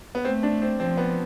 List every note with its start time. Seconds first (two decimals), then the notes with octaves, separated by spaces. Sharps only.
0.15 B3
0.24 A3 C4
0.43 D4
0.62 C4
0.80 F3 C4
0.97 B3